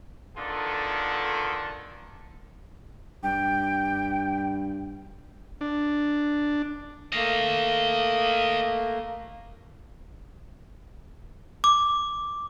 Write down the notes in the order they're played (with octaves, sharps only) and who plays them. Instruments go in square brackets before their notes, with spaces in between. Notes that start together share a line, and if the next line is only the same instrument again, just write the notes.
[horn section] D3 D#3 B3 F4 G#4 A4
[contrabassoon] G2 [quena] G5
[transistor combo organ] D4
[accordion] A3 A#3 [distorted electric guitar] D#5 F5
[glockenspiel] D6